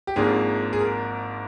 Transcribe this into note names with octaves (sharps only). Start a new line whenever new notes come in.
G4
G#1 G#2 F3 A#3 D4 G#4
G#4
A#4